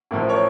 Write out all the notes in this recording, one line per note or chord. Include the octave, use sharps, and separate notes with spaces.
A1 A2 F3 A#4
A#4 C#5